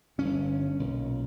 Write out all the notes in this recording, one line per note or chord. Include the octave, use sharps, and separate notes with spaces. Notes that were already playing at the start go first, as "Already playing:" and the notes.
G1 G2 D3 C#4
B1 A#2